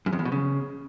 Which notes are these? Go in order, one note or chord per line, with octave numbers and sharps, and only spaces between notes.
F#2
F2
E2
B2
C#3